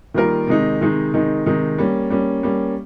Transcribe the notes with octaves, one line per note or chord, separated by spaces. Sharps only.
D#3 G3 A#3 F4 A#4
C3 D#3 G#3 D#4
C3 D#3 G#3 D#4
C3 D#3 G#3 D#4
C3 D#3 G#3 D#4
G3 A#3 C#4
G3 A#3 C#4
G3 A#3 C#4